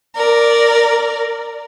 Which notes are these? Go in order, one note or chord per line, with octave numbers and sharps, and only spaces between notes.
A#4 D5